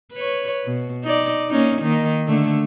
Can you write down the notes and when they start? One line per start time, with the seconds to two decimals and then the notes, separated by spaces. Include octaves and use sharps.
0.13 B4 C#5
0.65 B2
1.03 D#4 D5
1.49 A#3 C#4 D#4
1.81 D#3 A#3 D#4
2.27 D3 A3